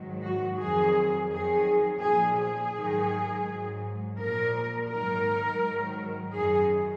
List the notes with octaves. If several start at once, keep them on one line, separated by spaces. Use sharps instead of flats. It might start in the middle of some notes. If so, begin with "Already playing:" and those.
Already playing: G#2 D#3 F#3
F#4
F2 D#3 F#3 G#4
F2 D#3 F#3 G#4
A#2 F3 G#4
G#4
G#2 D#3 F#3
G#2 F#3
A#2 F3 A#4
G#2 D#3 F#3 A#4
G#2 D#3 F#3
F#2 D#3 F#3 G#4